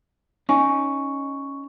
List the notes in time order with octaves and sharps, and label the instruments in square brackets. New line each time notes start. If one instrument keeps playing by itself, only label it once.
[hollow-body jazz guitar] C#4 D#4 [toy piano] G#5 [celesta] C#6